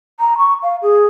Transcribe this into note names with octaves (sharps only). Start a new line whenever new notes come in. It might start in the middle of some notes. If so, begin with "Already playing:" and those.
A#5
C#6
F5
G#4